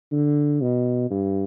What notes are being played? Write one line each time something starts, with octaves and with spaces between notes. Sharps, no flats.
D3
B2
G2